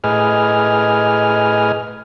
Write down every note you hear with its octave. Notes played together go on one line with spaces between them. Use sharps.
A2 G#4 B4 D#5 G#5 F6